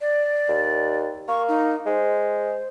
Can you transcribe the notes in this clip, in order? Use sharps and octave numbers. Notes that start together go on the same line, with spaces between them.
D5
D#2
A#3 C#6
D#4
G#3 C5